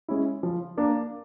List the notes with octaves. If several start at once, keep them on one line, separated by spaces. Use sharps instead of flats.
G#3 C#4 E4
F3
A#3 D4